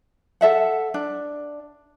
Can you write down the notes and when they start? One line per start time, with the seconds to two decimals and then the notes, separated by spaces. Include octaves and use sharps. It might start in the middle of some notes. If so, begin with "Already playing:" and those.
0.41 A4 E5 F#5
0.94 D4